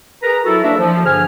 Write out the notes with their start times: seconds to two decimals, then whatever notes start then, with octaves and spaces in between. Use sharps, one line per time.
0.23 G#4 A#4 B4 A#5
0.45 F#3 E4 F#4 A4
0.63 A#3 D4 F#4 D5 E5
0.78 F3
1.05 G2 D3 G#4 G#5 F6